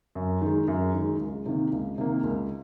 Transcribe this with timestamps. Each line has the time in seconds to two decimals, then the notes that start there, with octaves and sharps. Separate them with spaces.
0.15 F#2
0.41 D#3 G#3
0.68 F#2
0.94 D#3 G#3
1.20 C#2
1.46 C3 D#3 A#3
1.72 C#2
1.98 C3 D#3 A#3
2.24 C#2